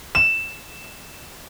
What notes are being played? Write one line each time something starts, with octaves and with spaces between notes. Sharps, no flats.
E7